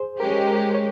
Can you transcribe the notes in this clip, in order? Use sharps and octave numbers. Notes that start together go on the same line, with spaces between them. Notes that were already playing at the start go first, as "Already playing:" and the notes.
Already playing: G#4 C5
G#3 C#4 G4 A#4
A#4
C#5